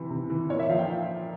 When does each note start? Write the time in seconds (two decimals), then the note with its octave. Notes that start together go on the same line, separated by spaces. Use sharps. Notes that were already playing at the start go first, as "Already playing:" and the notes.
Already playing: C3 E3
0.11 C3
0.30 E3
0.50 A#2 C#5
0.60 E5
0.69 F3 F5
0.79 G5